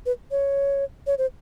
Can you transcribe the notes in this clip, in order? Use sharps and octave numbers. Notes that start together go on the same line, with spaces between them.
B4
C#5
C#5
C5